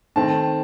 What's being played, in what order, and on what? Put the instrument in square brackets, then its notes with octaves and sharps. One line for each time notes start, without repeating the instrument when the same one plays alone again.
[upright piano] D#3 A3 C4 A5